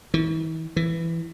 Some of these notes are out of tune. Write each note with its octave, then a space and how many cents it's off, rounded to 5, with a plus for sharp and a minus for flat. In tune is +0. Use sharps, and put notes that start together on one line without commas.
E3 -45
E3 +10